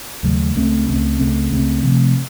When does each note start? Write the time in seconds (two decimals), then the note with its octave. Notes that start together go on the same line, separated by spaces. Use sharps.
0.23 D#2 C#3 F#3 A3
0.56 C#2 C#3 A3 C4
0.88 C#2 C#3 A3 C4
1.19 C#2 C#3 A3 C4
1.52 C#2 C#3 A3 C4
1.84 C3 F3 A3 C4